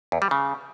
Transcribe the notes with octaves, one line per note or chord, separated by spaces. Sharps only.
E2
G3
C#3